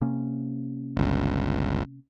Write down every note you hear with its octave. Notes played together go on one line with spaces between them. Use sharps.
C3 A#3 C#4
G1 C#2